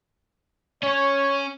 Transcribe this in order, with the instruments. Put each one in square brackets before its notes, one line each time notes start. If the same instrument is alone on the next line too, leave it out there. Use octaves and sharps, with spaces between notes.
[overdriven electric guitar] C#4 [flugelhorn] C#5